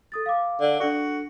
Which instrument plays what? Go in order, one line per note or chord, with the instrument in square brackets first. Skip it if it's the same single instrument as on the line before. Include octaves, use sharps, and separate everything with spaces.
[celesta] A4 D#6 A6
F5 D6
[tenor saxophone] D3
[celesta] D4 A4 [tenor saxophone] F#4